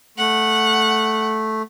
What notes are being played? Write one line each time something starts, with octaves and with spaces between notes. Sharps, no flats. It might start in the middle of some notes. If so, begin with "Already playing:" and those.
A3 F#5